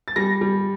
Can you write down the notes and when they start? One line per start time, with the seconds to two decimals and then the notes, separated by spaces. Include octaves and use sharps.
0.08 A6
0.16 G3 A#6
0.41 G3